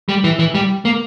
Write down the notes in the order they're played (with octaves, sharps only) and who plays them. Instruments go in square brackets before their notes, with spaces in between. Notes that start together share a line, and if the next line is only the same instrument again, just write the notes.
[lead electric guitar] G3
E3
E3
G3
A#3